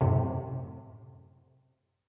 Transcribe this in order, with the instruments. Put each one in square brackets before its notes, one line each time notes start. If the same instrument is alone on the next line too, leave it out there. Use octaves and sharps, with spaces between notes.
[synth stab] F#2 A2 C3